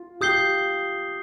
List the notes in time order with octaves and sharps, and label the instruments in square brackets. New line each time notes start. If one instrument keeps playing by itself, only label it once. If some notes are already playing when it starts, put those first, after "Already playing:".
Already playing: [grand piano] F4
[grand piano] G4 [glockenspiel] D#6 G6 C7 G7